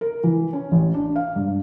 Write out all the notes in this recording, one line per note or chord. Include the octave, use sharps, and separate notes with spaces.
A#4
E3
C#4
A1
D4
F5
G2